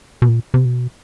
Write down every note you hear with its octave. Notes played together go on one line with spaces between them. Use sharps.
B2
A#2
C3
B2